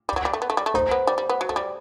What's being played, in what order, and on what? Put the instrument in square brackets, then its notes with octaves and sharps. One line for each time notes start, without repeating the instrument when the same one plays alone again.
[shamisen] G3
F#3
G3
A3
B3
A3
G3
A3
[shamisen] D#4 [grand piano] C5
[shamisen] B3
G3
G3
B3
F#3
A3
G3